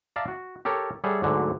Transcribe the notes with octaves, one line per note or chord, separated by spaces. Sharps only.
D5 E5 F5 A5 A#5
F#4
G4 A4 A#4 C#5
G3 G#4 A4 C#5 E5 F#5
D2 G#2 D3 F#3